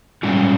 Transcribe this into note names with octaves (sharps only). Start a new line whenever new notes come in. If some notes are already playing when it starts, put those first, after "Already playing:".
G#2 G3 C#4 F4